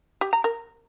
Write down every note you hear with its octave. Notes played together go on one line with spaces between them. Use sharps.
G4
A#5
A#4